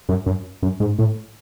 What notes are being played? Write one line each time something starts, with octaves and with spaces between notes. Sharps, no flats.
F#2
F#2
F#2
G#2
A2